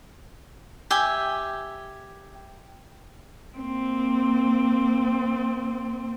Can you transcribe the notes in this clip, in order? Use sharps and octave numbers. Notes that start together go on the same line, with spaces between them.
G4 E5 G#5
A#3 C4